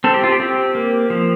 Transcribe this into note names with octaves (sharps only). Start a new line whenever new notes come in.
C4 A4
G4
F4
G4
C4
A#3
F3